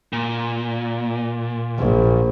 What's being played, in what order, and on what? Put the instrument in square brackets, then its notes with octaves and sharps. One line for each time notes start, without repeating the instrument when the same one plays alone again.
[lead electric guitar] A#2
[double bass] A#1